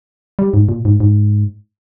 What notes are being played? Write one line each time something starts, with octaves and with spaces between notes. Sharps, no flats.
G3
G#2
A#2
G#2
G#2